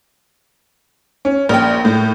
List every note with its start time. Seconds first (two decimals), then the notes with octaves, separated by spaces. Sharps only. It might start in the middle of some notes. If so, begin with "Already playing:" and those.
1.25 C#4
1.49 A#1 A#4 G5
1.85 A2